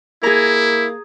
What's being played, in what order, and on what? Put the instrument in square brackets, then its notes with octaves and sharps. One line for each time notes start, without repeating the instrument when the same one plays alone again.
[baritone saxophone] A#3 [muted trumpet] E4 [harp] G#4 A#5